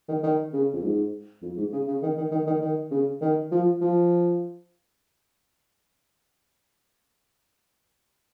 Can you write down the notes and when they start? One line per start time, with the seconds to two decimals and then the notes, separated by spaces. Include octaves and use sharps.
0.09 D#3
0.23 D#3
0.53 C#3
0.73 F2
0.83 G#2
1.42 F2
1.57 G#2
1.73 C#3
1.88 C#3
2.03 D#3
2.18 D#3
2.32 D#3
2.47 D#3
2.62 D#3
2.91 C#3
3.21 D#3
3.51 F3
3.81 F3